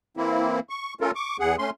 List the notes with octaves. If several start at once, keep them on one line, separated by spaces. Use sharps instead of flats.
E3 A#3 C4 E4
C#6
A3 C#4 F4 A4 A#4
C#6 D6
E2 G#4 F#5
A3 C#4 C6